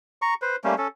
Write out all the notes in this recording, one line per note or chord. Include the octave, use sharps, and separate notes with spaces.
A#5 C#6
B4 C5
G3 A3 A#3 C#4
C#4 A4